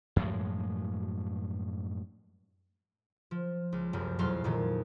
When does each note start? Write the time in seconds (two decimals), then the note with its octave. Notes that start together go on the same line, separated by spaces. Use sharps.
0.16 F#2 A2 F3 G#3
3.31 F3
3.72 C#2
3.93 F1 C2 F#2
4.19 E1 F2 F#3 F5 C6
4.44 F2 A#2 D#3 G#3